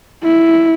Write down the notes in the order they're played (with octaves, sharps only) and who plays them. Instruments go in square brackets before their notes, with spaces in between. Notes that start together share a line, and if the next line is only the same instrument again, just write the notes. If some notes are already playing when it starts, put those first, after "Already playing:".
[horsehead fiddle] E4